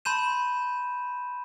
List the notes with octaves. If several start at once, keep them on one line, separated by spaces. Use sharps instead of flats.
A5 B5 C6 G6 D#7 E7